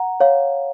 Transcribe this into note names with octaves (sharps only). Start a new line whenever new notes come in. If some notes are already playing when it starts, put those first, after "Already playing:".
Already playing: F#5 A#5
C#5 F5